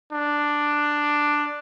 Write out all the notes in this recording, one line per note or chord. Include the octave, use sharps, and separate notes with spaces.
D4